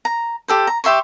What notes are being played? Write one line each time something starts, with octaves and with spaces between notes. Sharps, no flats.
A#5
G4 A4 C5
A#5
G4 E5 C6 C#6